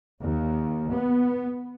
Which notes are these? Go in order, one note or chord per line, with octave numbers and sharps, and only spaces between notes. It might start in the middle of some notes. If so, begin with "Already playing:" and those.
D#2
B3